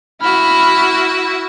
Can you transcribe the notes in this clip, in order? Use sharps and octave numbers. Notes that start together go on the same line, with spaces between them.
E4 F#4 B5 F6